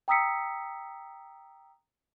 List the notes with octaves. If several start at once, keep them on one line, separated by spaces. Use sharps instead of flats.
G5 A#5 D#6 E6 B6 C#7